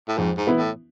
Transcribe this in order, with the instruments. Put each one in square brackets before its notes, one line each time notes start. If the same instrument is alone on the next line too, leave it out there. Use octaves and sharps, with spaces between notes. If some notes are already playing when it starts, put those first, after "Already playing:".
[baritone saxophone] A2
[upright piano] F2 [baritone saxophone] G#2
[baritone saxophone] G#2
[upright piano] E3 B3 E4
[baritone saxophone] A2